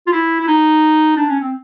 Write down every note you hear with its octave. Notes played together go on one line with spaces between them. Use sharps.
F4
E4
E4
D#4
D4
C#4
C4